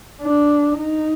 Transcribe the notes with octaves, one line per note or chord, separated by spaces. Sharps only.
D4
D#4